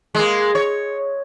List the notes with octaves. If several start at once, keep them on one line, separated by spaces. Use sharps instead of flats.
G#3 A#3
C#5